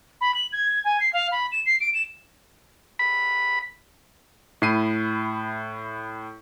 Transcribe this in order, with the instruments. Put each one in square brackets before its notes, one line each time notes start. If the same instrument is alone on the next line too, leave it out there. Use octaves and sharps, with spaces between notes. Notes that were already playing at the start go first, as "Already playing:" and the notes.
[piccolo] B5
F#7
G#6
G#5
C7
F5
B5
E7
C7
D7
E7
[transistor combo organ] B5
[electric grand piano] A2 E4 C7 D#7